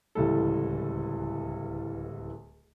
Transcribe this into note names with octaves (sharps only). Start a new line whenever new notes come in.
D1 C#2 E3 G3 A4